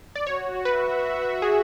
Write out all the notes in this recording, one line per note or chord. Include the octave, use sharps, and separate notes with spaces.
D5
F#4 C#5
B4 E5
G#4